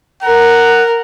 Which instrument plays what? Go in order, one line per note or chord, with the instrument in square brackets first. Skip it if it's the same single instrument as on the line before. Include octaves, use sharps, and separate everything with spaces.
[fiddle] A#4 [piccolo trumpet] F#5